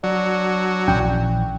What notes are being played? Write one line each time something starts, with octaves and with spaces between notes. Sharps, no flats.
F#3 D4
A#1 E3 C#4 G5